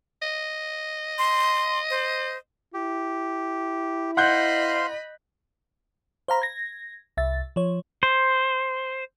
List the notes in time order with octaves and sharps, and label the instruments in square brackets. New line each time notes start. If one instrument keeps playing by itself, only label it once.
[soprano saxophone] D#5
[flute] C6
C5
[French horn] E4 [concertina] G4
[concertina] C5 F5 C6 [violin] D#5 B5 [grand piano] F#5 F#6 G6
[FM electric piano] C5 F5 A#5 B5
G#6 A#6
C2 E5 A6
F3 C#5
[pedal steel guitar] C5